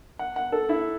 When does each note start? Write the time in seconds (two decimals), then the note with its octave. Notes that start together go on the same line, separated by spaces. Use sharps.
0.19 F#5
0.36 F#5
0.52 A4
0.69 E4